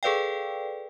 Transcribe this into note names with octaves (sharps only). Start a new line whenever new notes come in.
G#4 A4 B4 D5 F5 G5